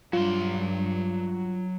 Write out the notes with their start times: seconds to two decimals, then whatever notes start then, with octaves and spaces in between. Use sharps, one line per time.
0.13 G2 F#3 F4 C6